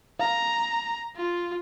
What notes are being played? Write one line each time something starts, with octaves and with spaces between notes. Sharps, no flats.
F5 A#5
F4